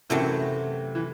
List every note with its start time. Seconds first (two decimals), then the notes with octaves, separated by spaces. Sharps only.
0.10 F#2 C3 E3 F#3 A3 C4
0.95 E3